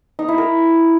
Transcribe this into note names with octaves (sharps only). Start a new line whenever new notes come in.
D#4
E4
A#4